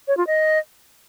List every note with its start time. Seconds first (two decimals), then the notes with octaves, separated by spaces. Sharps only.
0.08 C#5
0.17 F4
0.27 D#5